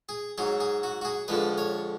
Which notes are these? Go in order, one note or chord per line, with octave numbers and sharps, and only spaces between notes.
G#4
G#2 F#3 G#4
G#4
F#4
F#4
G#4
F2 D3 F3 G#3 B4
C#5